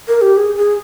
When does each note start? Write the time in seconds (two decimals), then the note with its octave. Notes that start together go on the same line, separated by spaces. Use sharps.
0.08 A#4
0.21 G4
0.37 G#4
0.56 G#4